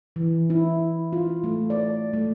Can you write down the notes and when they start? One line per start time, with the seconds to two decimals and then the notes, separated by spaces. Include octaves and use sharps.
0.16 E3
0.50 E4
1.13 F4
1.44 A3
1.70 D5
2.13 A3